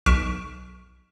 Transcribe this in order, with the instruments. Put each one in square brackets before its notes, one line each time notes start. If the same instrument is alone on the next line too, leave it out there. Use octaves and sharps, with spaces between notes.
[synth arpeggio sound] B1 C#6 F6 B6 D7 E7